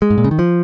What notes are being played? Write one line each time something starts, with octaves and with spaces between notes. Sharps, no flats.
G#3
G#2
A#2
C#3
D#3
F3